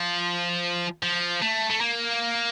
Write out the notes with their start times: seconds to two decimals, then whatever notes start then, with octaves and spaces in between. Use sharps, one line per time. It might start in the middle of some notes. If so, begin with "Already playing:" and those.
Already playing: F3
1.03 F3
1.42 A3
1.70 A3
1.81 A#3